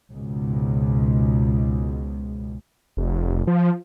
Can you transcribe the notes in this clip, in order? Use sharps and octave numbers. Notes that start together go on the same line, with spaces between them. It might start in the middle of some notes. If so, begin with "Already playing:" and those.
C#2 G#2 B2
F1
F3